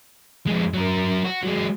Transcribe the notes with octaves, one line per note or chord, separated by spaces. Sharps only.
F2 G#3
F#3 A#4
F#4
F#3 G#3